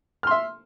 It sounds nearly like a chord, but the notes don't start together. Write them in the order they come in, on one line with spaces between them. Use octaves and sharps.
F6 C6 E5